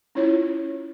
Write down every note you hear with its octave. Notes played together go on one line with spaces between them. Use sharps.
C#4 E4 F4 C#5